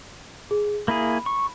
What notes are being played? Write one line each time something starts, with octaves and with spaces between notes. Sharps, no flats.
G#4
A#3 E4 G#4 B5
C#6